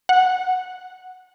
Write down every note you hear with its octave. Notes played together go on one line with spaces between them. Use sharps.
F#5